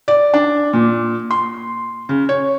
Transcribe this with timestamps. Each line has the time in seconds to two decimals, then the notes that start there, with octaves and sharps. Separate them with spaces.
0.08 D5
0.34 D4
0.73 A#2
1.31 C6
2.09 C#3
2.29 C#5